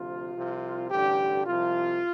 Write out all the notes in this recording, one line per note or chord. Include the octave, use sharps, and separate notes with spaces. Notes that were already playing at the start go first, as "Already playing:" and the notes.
Already playing: D2 C3 F3 F4
C2 C3 F3
A1 G2 D3 G4
C2 C3 F3 F4